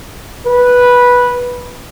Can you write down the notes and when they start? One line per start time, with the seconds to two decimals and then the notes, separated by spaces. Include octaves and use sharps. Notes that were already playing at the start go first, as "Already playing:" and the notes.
0.46 B4